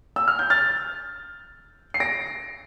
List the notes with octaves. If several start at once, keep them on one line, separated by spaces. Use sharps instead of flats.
E6
F6
G6
F6 A6
C7
A#6 D7